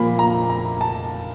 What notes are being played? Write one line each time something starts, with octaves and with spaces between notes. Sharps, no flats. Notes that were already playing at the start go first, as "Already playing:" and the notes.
Already playing: A#2 F3 A#3 B5
A#5
A#5
A5